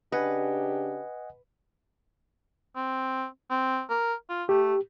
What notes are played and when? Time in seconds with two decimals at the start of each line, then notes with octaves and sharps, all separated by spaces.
0.12 C#3 D4 G4 B4 D#5 F#5 G#5
2.76 C4
3.50 C4
3.89 A#4
4.29 F4
4.49 A3 G4